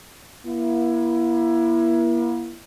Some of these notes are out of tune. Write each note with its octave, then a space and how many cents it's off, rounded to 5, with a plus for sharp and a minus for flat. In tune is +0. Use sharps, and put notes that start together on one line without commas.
A#3 +40 E4 +20